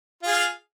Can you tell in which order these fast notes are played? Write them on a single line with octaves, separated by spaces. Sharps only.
F4 G#4 F5